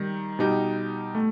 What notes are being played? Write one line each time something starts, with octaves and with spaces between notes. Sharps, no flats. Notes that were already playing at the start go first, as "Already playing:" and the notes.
Already playing: D#3 G3 D#4
B2 G3 D#4 G4
A3